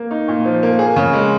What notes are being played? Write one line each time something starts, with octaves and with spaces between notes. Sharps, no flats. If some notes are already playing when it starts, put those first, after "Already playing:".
Already playing: A#3
D#4
A#2
F3
A#3
G#4
C#3
G#3